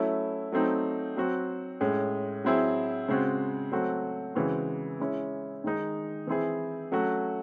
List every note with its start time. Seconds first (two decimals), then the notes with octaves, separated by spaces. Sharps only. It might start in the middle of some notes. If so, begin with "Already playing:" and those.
Already playing: F#3 A3 C#4 E4
0.52 F#3 A3 C4 D#4
1.16 F#3 C4 F#4
1.80 A2 G#3 C#4
2.44 F#3 C4 E4 G#4
3.08 C#3 G#3 C4 F#4
3.72 F#3 A3 C4 F#4
4.35 C#3 E3 G#3 C4 F#4
5.00 G#3 C#4 E4
5.64 D#3 G#3 D#4
6.27 E3 C4 E4 G#4
6.92 F#3 A3 C#4 F#4